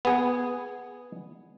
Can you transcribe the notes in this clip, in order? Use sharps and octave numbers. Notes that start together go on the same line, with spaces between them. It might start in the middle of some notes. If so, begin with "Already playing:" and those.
B3 G#4